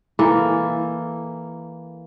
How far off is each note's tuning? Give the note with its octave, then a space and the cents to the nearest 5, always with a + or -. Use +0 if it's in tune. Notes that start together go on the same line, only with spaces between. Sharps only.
E3 +0 A#3 +0 A4 +0